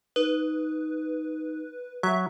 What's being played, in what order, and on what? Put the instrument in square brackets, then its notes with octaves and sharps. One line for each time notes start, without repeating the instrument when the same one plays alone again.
[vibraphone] D#4 [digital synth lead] B4
[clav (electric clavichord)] F#3 [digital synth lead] E5